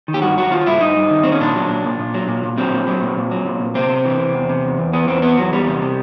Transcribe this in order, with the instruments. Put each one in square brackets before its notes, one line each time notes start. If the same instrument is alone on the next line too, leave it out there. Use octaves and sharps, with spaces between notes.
[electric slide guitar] D#3
G4
G2 F#4
F#3 F#4
D#3 F4
G2 E4
G2 D#4
G2
D#3
D#3 C4
C#4
A#2 D4
F#3
A#2
A#2
A#2
F#3
A#2
A#2
F#3 C4
A#2
F#3
A#2
A#2
F#3
A#2
A#2
C3 C4
C3
E3
C3
E2
C3
E2
E2
E3 B3
E2 C4
E3 B3
E2 F#3
E2 G3
C3
C3